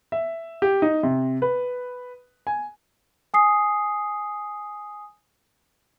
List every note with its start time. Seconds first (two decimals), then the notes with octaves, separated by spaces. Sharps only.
0.12 E5
0.62 G4
0.82 D#4
1.03 C3
1.42 B4
2.47 G#5
3.34 G#5 D#6 C7